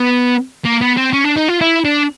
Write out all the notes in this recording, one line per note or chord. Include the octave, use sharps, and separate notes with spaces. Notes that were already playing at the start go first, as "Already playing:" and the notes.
Already playing: B3
A#3
B3
C4
C#4
D4
D#4
F4
E4
D4